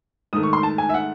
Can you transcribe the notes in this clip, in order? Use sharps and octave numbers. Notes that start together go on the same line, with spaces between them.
G#2 D#3 A3 D#6
C#6
C6
A5
G#5
E5
F#5